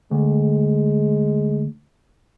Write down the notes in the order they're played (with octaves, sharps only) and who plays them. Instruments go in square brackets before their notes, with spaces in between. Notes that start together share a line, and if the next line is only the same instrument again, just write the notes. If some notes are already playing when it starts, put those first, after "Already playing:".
[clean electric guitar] D2 [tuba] G#3